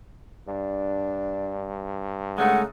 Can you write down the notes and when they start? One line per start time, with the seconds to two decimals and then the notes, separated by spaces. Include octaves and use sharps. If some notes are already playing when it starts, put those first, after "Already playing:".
0.48 G2 D4
2.38 C#3 G#3 A3 D#4 F#5